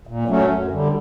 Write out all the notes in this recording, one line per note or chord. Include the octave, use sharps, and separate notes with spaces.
A#2
F#3 A3 C#4
F#2
D3 G3